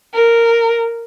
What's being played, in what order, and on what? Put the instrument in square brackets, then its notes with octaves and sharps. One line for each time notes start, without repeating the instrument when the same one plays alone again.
[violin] A#4